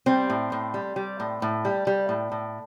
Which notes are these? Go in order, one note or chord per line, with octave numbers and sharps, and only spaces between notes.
G3 C4
A2
A2
G3
G3
A2
A2
G3
G3
A2
A2